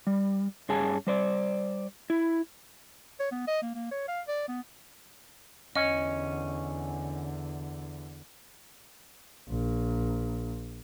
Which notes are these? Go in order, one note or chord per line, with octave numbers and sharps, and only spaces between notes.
G3
G2 C#4 G#4 G#5 A5
G3 C5 D5
E4
C#5
B3
D#5
A#3
A#3
C#5
F5
D5
B3
E2 D3 C#4 D#5
A#1